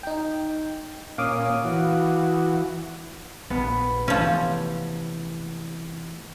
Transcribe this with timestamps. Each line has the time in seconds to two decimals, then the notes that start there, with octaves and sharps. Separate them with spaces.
0.03 D#4 G5
1.18 A#2 C#4 F5 D6 D#6
1.65 E3 F#4
3.50 A#1 B3
4.08 C3 E3 F3 A3 C#4